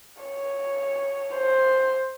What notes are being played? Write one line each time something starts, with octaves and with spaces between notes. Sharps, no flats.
C#5
C5